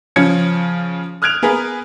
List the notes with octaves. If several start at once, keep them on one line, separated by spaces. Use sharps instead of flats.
C#3 F3 C#4 G#6 C#7
D#6 F6 F#6 G#6 D7 F7
B3 G#4 A#4 B4